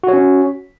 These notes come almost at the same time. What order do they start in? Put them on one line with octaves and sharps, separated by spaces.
F#4 C#5 C#4